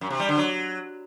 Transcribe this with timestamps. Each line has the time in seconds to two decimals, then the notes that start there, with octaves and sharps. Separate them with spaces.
0.01 F#2
0.10 C3
0.20 G3
0.29 D3
0.38 F#3